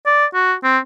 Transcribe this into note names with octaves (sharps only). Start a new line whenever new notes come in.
D5
F#4
C4